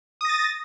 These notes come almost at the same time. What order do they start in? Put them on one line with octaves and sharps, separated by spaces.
D#6 A#6 A6